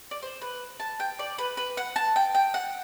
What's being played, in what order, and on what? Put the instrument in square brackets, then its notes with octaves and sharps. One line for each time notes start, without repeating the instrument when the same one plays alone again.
[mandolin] D5
C5
B4
A5
G5
D5
B4
B4
F#5
A5
G5
G5
F#5